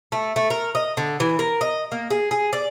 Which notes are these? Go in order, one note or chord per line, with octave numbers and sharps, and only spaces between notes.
A3
A3
A#4
D#5
D3
E3
A#4
D#5
A#3
G#4
G#4
D5